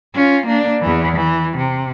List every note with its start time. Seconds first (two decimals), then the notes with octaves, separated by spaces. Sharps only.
0.14 C#4 F4
0.46 A#3 D4
0.81 E2 E3
1.16 E3
1.57 C3